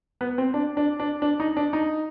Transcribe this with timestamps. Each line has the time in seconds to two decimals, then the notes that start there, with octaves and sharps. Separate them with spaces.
0.21 B3
0.38 C4
0.54 D4
0.77 D4
1.00 D4
1.22 D4
1.40 D#4
1.57 D4
1.73 D#4